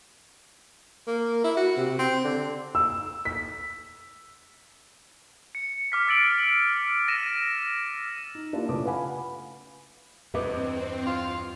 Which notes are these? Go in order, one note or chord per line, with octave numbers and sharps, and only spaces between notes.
A#3
E4
F#4
C3
C4
D3
E6
B6
C#7
D6 F6 B6
E6 A6 D7 F#7
A#6 D#7 E7
D#4
A#3 D4 E4 F4 G4
A2 C#3 C#4 F4 B4 D6
B4 F5 F#5 G#5 B5
E2 G2 C4 B4 D#5 D6
F4